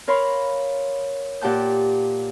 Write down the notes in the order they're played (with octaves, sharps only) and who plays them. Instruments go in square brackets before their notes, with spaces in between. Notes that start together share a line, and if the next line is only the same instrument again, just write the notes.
[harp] A#4 C#5 F5 B5 C6
A#2 G4 F#5 A5 G6